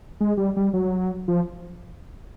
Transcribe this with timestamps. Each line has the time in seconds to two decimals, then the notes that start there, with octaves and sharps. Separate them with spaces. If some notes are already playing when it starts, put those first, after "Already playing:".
0.21 G#3
0.37 G3
0.56 G3
0.73 F#3
1.28 F3